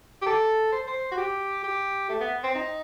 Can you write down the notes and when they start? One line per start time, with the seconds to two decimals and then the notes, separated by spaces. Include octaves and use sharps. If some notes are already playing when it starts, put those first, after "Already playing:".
0.22 G4
0.26 A4
0.72 C5
0.87 C5
1.11 F#4
1.18 G4
1.64 G4
2.09 A3
2.20 B3
2.43 C4
2.55 D#4